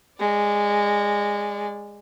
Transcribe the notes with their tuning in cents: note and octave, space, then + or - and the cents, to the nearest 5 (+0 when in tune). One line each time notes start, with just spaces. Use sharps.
G#3 -15 D5 +0